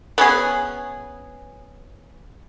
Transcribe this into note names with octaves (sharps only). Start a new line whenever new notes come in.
B3 C#4 G#4